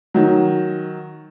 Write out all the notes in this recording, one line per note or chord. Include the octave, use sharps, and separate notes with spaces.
D#3 F#3